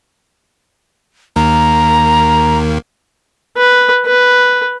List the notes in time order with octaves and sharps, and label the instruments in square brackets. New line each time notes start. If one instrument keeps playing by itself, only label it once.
[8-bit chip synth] D#2 D#3 A#3 [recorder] A#5
[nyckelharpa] B4
B4